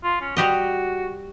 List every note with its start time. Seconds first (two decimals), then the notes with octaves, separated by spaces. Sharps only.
0.04 F4
0.21 C#4
0.37 G3 F#4 G4 D#5